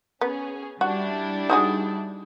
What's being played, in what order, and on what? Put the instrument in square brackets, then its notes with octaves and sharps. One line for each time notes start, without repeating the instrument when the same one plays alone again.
[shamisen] B3 [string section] C#4 G#4
[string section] G3 D4 E4 [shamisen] F#4
[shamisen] D#4 F#4 G#4